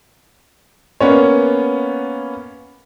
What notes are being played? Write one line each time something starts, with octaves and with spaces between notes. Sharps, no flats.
A#3 B3 C#4 C#5